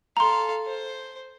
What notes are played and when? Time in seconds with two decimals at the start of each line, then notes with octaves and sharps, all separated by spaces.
0.17 A4 F5 A#5 C6
0.66 C5